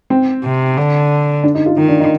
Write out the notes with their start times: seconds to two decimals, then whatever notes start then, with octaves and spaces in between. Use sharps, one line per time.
0.10 C4
0.44 C3
0.78 D3
1.44 D4
1.55 D#4
1.66 F4
1.77 D#3 D#4
1.89 D4
2.00 D#4